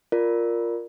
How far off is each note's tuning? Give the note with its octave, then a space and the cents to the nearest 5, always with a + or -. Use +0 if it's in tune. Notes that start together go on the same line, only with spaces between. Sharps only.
F4 +0 A#4 +0 D5 +0